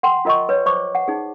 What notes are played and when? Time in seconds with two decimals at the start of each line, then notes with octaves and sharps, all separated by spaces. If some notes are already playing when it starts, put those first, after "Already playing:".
0.03 F#5 G5 C6
0.25 F4 A#4 D#5 F#5 C#6
0.49 B4 C#5
0.66 C5 D5 C#6 D6
0.95 F#5
1.08 D#4 G#4